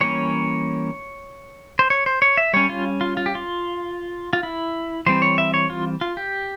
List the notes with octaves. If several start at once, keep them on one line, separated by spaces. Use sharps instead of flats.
E3 G3 A#3 C#4 C#5
C5
C#5
C5
C#5
E5
G3 C#4 C#5
F4
F4
F4
G4
F4
F4
E4
E3 G3 C4 C5
C#5
E5
C#5
F4
F4
G4